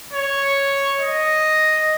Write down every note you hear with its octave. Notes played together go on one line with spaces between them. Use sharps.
C#5
D#5